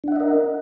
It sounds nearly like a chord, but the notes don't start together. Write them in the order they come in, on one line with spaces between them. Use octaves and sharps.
D4 F#5 E5 D#5 A#4